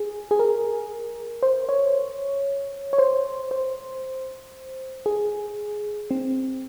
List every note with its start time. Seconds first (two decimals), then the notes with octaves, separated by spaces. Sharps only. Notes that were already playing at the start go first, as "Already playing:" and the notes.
Already playing: G#4
0.31 G#4
0.39 A#4
1.43 C5
1.69 C#5
2.93 C#5
2.98 C5
3.51 C5
5.06 G#4
6.11 C4